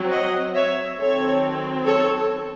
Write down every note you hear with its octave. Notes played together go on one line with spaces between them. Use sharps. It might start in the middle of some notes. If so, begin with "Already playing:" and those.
Already playing: F#3 C4
D#5 F#5
C#5 E5
D#3 F#3 C4 A4 C#5
A4 C#5